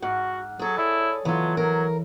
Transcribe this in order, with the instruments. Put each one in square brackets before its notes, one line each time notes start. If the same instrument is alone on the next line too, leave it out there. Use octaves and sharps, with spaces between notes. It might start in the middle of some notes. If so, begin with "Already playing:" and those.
[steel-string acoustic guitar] G#2 [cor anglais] F#4 [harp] F#5 F6
[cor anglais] F#3 [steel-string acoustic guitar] G#4 A4
[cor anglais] E4 [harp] C#5 D5
[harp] E3 A4 [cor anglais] F#3 [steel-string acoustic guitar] B3 F4
[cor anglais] F#3 [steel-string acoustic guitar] A#4